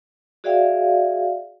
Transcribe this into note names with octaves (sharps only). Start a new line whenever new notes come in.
F#4 G#4 D5 E5 F5 G5